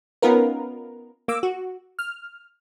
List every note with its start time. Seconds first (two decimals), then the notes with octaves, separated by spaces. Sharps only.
0.22 B3 C#4 D#4 F4 A#4 B4
1.28 A#3 D6 E6
1.43 F#4
1.99 F6